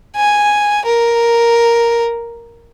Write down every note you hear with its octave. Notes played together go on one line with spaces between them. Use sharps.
G#5
A#4